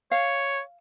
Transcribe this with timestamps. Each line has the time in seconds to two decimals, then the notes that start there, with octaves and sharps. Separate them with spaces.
0.11 C#5 F5